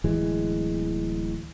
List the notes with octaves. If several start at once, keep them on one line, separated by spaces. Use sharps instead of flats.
D1 E3 G#3